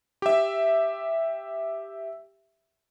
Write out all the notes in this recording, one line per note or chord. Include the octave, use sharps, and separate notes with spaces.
G4 E5